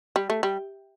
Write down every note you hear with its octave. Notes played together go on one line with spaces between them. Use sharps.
G3
A3
G3